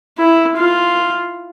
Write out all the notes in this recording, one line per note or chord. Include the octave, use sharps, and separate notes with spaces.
E4
F4